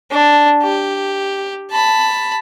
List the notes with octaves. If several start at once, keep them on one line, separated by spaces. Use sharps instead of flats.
D4
G4
A5 B5